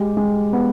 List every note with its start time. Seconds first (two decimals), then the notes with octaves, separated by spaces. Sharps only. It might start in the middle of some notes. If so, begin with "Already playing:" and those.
Already playing: G#3 G4
0.17 G#3
0.53 B3